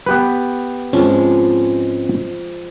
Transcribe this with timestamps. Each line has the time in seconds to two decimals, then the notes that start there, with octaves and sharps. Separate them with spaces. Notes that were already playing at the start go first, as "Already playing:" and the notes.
0.06 B3 G4 B4
0.93 G#2 F3 G#3 C4 C#4